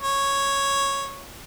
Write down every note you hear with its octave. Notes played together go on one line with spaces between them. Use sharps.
C#5